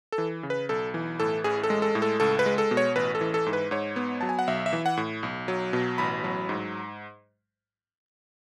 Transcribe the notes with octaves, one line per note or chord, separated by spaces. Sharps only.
A4
E3
C#3
B4
B1 A4
E3
A2 A4
A1 G#4
A4
G#3
A4
A2
A4
C#2 A4
B4
G#3
A4
B2
C#5
A1 B4
A4
E3
A4
G#2
B4
G#2 C#5
B3
F#3 A5
G#5
F#5
B1 E5
E5
E3
F#5
A2
B1
F#3
B2
A1 B5
F#3
G#2